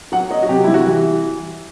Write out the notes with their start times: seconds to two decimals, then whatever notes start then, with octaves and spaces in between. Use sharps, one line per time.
0.12 F#3 F#5
0.30 F#3 D#5
0.43 F#4
0.49 C3 G4
0.64 G3 E4
0.74 F#4
0.87 E3